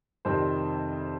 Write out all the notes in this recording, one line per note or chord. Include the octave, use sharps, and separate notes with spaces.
F2 C3 D#3 G3 C4 C5